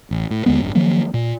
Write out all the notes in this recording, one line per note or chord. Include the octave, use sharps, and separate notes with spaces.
A1
A2
D#2 D3 G#3 B3
G#1 F#2
D#3 F3 F#3 A#3
A#2